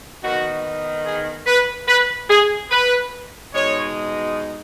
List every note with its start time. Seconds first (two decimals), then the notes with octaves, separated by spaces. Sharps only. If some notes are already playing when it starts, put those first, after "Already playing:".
0.22 D#3 B3 D#4 F#4
1.04 G#4
1.45 B4
1.86 B4
2.28 G#4
2.69 B4
3.52 B2 G#3 D#4 C#5